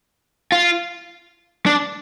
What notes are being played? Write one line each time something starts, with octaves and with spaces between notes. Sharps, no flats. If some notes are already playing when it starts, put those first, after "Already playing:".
F4
D4